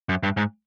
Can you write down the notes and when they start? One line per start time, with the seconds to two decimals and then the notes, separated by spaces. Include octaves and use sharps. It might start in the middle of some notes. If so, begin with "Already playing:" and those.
0.09 F#2
0.23 G2
0.37 G#2